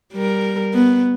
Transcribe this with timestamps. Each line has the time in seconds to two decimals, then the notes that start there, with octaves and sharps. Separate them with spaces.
0.13 G3 A#4
0.74 B3